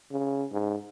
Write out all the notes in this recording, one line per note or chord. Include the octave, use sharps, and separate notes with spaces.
C#3
G#2